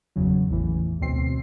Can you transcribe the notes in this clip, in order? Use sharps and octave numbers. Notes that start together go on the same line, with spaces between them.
G1 E2 C#3 F#3
A1 E2 A2 E3
D2 B2 C4 C7